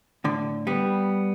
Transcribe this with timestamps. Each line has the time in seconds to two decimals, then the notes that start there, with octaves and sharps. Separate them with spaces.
0.24 A2 D3
0.67 G3 B3